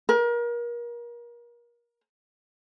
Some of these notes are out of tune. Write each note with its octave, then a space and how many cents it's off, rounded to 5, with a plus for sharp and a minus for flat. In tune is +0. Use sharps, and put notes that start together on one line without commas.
A#4 +35